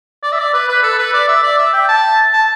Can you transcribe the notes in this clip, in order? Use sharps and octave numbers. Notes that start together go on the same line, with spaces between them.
D5
E5
D5
B4
B4
A4
B4
D5
E5
D5
E5
G5
A5
A5